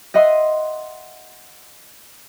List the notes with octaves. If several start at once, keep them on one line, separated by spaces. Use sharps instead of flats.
D#5 E5 F#5 C6 D#6